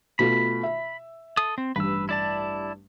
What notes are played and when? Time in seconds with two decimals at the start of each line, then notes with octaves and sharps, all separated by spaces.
0.19 B2 A3 F4 B5
0.63 E5
1.37 A4 D#6
1.58 C4
1.76 A1 G2 B4 E6
2.09 E4 D5 A5